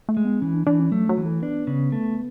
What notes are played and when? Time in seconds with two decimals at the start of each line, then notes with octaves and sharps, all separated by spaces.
0.09 A3
0.17 G#3
0.25 B3
0.41 E3 C#4
0.55 D4
0.67 E3 D4
0.80 C#4
0.92 F#3 A3
1.09 F#3
1.17 E3
1.26 A3
1.42 B3 D4
1.67 C#3
1.92 A3